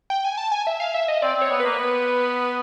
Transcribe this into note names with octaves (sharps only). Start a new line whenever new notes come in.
G5
G#5
A5
G#5
E5
F5
E5
D#5
C4 D5
C4
C#5
B3
A#3 B4
B3